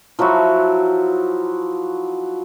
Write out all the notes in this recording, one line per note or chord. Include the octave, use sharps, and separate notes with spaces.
F3 F#3 E4 F#4